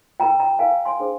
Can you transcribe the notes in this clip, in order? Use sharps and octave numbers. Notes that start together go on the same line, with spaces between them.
F4 A#4 G5 A#5
G5 A#5
F4 A#4 F5 G#5
G#5 C6
D4 G#4 C5